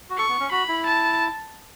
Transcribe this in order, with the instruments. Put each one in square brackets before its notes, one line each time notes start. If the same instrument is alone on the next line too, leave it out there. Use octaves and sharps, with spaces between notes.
[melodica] F#4
[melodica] A4 [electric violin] C#6
[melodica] B3
C#4
[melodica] F#4 [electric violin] B5
[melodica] E4
[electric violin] A5